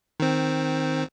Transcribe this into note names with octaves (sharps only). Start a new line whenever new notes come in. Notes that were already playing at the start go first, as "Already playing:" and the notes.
D#3 C4